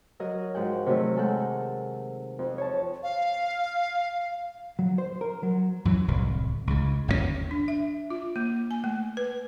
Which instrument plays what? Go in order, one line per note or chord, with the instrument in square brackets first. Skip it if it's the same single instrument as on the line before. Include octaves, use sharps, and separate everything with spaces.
[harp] F#3 A#4 D#5 F#6
G#2 F3 F#4 F#5 G5
C3 D#3 F#3 A3
G#3 A4 A#4 F#5 G6
F2
C#5 A5
[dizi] F5
[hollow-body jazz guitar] F#3
C5
A#4
F#3
[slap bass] F#2 E3 F#3
D1 C2 C3
C#2 C#3
G1 D#2 D#3 C#4
[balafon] D4
E5
F4
A#3
G#5
A3
B4